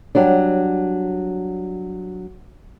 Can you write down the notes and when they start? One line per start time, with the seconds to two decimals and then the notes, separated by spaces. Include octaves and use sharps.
0.15 F#3 G3 D4